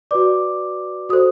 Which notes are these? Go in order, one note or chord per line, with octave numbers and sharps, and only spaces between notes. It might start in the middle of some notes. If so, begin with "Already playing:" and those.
F#4 B4 D5 D6
F#4 A4 C5 D#6